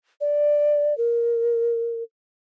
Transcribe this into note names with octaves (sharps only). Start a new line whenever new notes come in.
D5
A#4